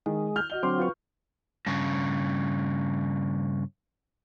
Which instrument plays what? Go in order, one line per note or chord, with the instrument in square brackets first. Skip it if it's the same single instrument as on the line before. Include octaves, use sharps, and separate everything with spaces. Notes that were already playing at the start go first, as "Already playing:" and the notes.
[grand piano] D#3 [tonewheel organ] G#3
[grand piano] F6 G6
F#4 D#5 G7
[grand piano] D3 C6 D6 [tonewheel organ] F#3 C4
[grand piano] F4 B4 C#6
[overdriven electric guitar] G2 C#3